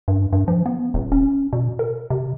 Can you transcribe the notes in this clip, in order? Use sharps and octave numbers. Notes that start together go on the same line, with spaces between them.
G2
G2
F3
B3
D#1
C#4
B2
A#4
C3